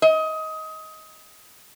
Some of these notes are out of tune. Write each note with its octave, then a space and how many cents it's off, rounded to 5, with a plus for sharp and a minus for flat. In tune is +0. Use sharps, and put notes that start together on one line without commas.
D#5 +20